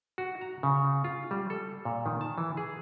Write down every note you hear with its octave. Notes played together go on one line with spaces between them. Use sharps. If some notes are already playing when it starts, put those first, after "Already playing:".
F#4
A#5
C#3
F4
G3
A4
A#2
D#3
A5
E3
G#4